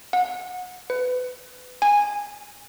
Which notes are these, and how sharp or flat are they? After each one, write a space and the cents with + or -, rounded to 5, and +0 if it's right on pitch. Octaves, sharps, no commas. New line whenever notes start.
F#5 -30
B4 +25
G#5 -15